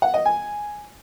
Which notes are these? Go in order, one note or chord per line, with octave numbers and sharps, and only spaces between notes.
F#5
D#5
G#5